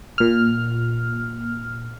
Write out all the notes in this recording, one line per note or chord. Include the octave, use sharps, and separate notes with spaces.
A#2 F6